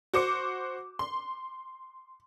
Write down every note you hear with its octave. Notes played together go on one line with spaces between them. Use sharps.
F#4 C5 D6 C#7
C6